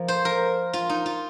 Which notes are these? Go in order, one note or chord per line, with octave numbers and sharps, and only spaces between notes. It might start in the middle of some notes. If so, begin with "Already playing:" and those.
Already playing: F3 A#3
C5
A#4
F4
D#4
F4